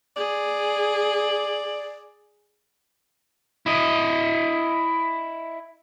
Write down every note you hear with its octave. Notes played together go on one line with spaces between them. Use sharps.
G#4 D5
E4 D#5